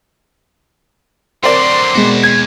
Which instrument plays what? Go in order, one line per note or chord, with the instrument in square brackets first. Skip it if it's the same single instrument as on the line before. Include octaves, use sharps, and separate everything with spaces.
[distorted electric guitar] D3 F#3 [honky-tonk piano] C4 A#4 D5 [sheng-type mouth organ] C6
[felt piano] B2 G#3 [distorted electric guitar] E4 F#4
[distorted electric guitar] D#2 [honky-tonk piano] G#6